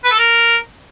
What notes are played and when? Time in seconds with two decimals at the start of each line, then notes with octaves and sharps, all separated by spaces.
0.04 B4
0.11 A4
0.18 A#4